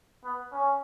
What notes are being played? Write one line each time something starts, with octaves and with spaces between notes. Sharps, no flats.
B3
C#4